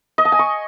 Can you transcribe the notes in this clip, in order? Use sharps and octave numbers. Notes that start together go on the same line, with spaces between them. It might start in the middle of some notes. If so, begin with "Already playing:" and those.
D#5
A5
G#5
C#6